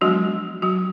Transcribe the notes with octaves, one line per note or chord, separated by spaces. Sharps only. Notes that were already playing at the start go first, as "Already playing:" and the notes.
F3 F#3 G#3 B3 D4 F#4
F#3 F#4